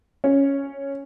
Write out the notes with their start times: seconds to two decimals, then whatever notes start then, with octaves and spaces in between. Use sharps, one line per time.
0.24 C#4